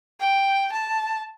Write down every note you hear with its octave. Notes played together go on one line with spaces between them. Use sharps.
G5
A5